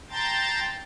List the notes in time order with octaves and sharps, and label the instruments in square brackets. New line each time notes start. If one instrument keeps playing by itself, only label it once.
[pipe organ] G5 A5 A#5 C6 G6 A6